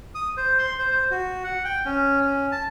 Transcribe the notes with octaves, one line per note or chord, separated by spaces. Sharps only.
D#6
C5
C6
C5
C5
F#4
F#5
G5
C#4
C#4
A5